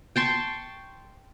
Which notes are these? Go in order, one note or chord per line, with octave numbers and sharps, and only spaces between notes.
G5 A5 C6 C#6